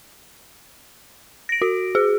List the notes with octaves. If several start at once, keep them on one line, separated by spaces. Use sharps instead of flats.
A#6 D7
F#4
G#4